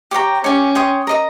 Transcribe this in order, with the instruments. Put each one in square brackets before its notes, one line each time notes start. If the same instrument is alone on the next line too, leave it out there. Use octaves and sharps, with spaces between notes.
[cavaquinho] G4 C#5 G5 A#5
[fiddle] C#4 [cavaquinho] G4 C#5 G#5
[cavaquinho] C#5 G5 C6 D#6
A#4 D#5 A#5